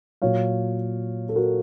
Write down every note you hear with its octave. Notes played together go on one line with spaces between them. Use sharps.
A#2 F#3 C#5 F5
A4
F#4 A#4